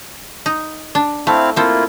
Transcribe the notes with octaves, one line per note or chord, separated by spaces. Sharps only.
D#4
D4
A3 C4 E4 F5
A#3 C4 E4 F4 A4